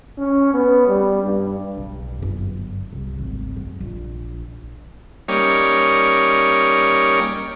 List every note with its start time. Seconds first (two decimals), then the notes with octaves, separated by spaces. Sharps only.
0.18 C#4
0.54 B3
0.88 G3
1.24 G2
1.77 B1
2.19 G1 F#2
2.93 C2
3.19 G#1 D2
3.57 F#2
3.81 A#1
5.28 G3 A#3 C#4 D#4 C#5 D5